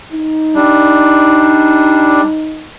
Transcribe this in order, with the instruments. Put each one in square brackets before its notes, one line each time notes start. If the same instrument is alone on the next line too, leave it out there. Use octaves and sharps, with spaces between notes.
[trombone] D#4
[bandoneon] G3 D4